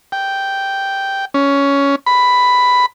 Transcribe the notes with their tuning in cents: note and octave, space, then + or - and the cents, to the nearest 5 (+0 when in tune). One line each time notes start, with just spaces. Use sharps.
G5 -5
C#4 +10
B5 +5